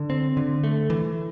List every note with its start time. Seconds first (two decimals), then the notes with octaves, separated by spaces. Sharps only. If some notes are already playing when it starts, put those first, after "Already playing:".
Already playing: D3
0.10 C4
0.37 D3
0.64 A3
0.90 E3